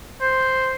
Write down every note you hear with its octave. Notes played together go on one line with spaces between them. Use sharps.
C5